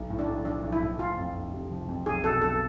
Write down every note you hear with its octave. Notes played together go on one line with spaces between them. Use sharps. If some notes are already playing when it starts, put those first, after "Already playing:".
Already playing: B1
A2
D4
B1
F3 D4
B1
E4
A2
F3 F4
F2
F1
C3
F3
F2
B1 G#4
B2 A4
B1 A4